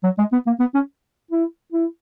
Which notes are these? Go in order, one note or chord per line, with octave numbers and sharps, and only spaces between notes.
F#3
G#3
B3
A#3
B3
C#4
E4
E4